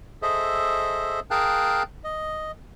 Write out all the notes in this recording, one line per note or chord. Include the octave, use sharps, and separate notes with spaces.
G#4 A4 C5 D#5 E5
G#4 A#4 F5 G5 A5 F#6
D#5